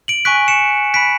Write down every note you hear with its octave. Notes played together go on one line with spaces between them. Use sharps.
D7 F#7
G#5 C#6 F#6 B6 D7
C#7 E7
B5 F#6 B6 D7